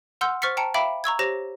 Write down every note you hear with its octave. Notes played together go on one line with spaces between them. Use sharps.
F#5 C6 E6 F6 G6
C5 C#6 F6 A6 B6 C#7
G5 A5 A#5 C#7
E5 F5 G5 B5 D6
A#5 C#6 E6 G#6
G4 C5 C#5 A#6 F7